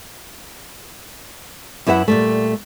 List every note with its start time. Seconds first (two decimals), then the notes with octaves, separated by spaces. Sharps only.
1.87 F#2 E4 B4 E5 F#5
2.08 A#2 G3 A3